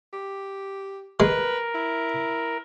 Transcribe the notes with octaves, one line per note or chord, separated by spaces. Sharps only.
G4
G#3 A#4 B4
E4